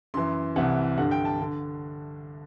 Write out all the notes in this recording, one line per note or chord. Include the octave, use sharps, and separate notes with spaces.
F#2 E3 C6
C2 C3 E3 F#5
G2 D3 F#5
G5
A5
D3